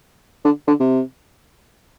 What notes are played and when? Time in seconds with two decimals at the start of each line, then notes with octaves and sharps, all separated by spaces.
0.45 D3
0.67 D3
0.80 C3